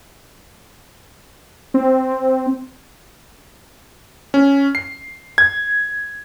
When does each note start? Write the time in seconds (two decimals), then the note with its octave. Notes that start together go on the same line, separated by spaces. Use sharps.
1.74 C4
4.34 C#4
4.75 C7
5.38 G#6